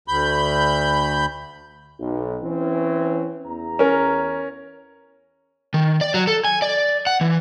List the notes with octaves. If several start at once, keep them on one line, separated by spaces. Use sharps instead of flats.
D2 B5 G6
B1
E3 C4 C#4
E2 A#5
C#4 A#4
D#3
D5
F#3
A4
G#5
D5
F#5
E3